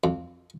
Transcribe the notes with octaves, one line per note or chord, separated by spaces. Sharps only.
F2